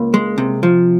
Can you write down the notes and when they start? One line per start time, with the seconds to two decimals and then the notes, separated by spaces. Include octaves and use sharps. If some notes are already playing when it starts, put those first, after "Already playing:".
Already playing: C#2 A#3
0.14 G#3
0.38 C3
0.63 F3